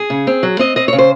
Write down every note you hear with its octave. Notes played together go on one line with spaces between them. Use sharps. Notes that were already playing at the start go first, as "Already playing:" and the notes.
Already playing: G#4
C#3
C4
F#3
C4 D#5
C4 D#5
C#3 C#5
C5